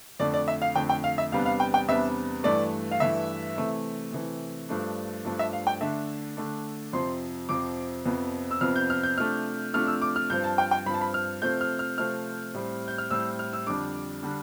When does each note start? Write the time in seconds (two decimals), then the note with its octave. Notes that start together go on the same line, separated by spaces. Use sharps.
0.20 F2 D3 A3 D5
0.34 D5
0.48 E5
0.62 F5
0.76 F2 D3 A3 G5
0.90 G5
1.04 F5
1.18 E5
1.32 E2 C3 G3 B3 D4 F5
1.46 F5
1.60 G5
1.74 G5
1.88 E2 C3 G3 B3 D4 E5
2.44 G2 E3 A3 D5
2.91 F5
3.00 G2 E3 A3 E5
3.56 C3 E3 A3
4.12 C3 E3 A3
4.69 G2 F3 A3 D4
5.25 G2 F3 A3 D4
5.39 E5
5.53 F5
5.67 G5
5.81 D3 A3 D4 E5
6.37 D3 A3 D4
6.93 F2 C3 F3 C4 C6
7.49 F2 C3 F3 C4 D6
8.06 F2 C3 F3 B3
8.51 E6
8.61 F2 C3 F3 B3 F6
8.76 G6
8.90 F6
9.03 G6
9.18 C3 F3 A3 D4 F6
9.74 C3 F3 A3 D4 F6
9.87 E6
10.02 D6
10.16 F6
10.30 G2 F3 C4 G6
10.44 A5
10.58 G5
10.71 G5
10.86 G2 F3 C4 B5
10.94 A5
11.01 B5
11.14 F6
11.42 C3 F3 A3 C4 G6
11.61 F6
11.79 F6
11.98 C3 F3 A3 C4 F6
12.54 A2 G3 C4
12.88 G6
12.98 F6
13.11 A2 G3 C4 E6
13.39 F6
13.53 E6
13.67 F2 D3 G3 D4 D6
14.22 D3 G3 D4